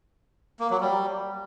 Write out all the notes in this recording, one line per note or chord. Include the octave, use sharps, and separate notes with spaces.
A#3
F#3
G3